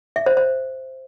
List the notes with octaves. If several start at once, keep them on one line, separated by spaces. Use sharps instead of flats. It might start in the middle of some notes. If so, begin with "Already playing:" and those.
E5
C5
C5